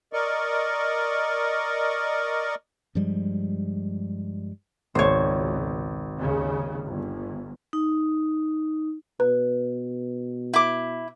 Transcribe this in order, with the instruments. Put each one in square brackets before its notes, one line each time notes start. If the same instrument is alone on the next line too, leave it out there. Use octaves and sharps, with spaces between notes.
[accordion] A#4 D5 D#5 C#6
[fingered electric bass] G2 F3 G3 G#3
[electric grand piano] G#1 [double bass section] C#2 B2 [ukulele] C5 C#5
[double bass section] D#2 C#3
G1
[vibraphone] D#4
[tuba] B2 [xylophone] B4
[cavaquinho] E4 D6